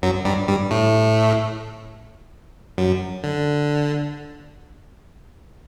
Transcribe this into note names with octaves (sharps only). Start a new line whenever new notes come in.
F#2 F#3
G2 G3
G2 G3
A2 A3
F#2 F#3
D3